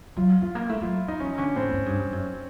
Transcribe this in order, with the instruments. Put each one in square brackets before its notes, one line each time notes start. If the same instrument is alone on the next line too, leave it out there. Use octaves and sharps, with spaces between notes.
[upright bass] F#3 [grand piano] F4
[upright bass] A3 [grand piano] F4
[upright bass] A#3
[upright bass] A3 [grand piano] E4
[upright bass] F#3 [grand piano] F4
[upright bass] E3 [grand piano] D#4
[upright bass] E3 [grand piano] C#4
[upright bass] D3 [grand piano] C#4
[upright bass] A2 [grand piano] C4
[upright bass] G#2
G2
G2
F#2